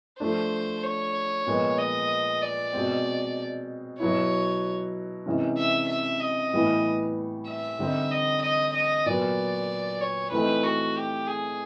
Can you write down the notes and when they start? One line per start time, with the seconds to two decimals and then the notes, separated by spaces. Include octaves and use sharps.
0.20 F3 A3 D4 C5
0.83 C#5
1.47 A#2 F3 G#3 B3
1.78 D#5
2.42 D5
2.73 B2 G#3 C4
4.00 B2 F#3 B3 E4 C#5
5.26 C3 E3 G#3 C#4
5.58 E5
5.89 E5
6.21 D#5
6.53 A2 E3 G3 B3
7.47 E5
7.79 D3 G3 C4 D#4
8.11 D#5
8.43 D#5
8.73 D#5
9.06 A#2 F#3 B3 D5
10.01 C#5
10.32 E3 A3 C4 D#4 B4
10.64 F#4
10.96 G4
11.27 G#4